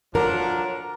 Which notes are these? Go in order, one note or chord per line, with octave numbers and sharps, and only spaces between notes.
F3 F#3 D4 A#4